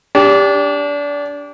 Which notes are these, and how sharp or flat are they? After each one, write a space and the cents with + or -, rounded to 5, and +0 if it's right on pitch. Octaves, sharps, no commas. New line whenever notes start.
D4 -25 G4 +20